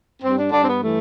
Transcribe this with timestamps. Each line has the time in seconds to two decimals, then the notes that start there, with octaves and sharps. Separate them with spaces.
0.23 G2 C4
0.37 D4
0.51 G2 D4
0.62 C4
0.67 B3
0.81 E3 A3